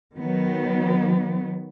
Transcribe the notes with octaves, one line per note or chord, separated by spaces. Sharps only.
D#3 F#3 B3